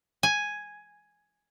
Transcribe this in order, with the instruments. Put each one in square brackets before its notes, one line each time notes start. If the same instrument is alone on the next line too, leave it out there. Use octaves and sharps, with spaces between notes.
[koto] G#5